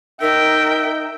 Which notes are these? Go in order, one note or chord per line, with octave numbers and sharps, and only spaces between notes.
D#4 A#4 E5 G5